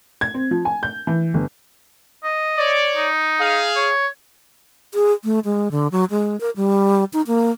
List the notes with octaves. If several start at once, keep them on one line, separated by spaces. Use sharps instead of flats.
G#6
C4
F3
G#5
G6
E3
G1
D#5
C#5 D5
D#4
G#4 F5
C#5
G#4
A3
G#3
D3
F#3
G#3
A#4
G3
D#4
A#3